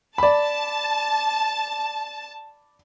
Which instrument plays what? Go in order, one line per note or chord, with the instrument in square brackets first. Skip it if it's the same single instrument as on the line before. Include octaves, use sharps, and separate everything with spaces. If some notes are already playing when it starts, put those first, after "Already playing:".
[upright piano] D5 B5 [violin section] A5